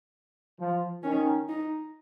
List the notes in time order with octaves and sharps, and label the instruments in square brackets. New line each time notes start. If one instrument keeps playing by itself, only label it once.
[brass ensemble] F3
[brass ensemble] D#3 [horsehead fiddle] C#4
[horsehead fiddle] D#4